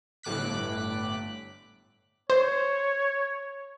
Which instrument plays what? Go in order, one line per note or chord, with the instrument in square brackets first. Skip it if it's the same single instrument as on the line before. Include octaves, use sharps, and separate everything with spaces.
[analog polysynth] G1 A2 D6 F#6 B6
[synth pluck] C5 [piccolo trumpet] C#5